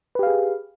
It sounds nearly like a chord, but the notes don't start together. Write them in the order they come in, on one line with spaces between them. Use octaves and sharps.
B4 G4 F5 G#4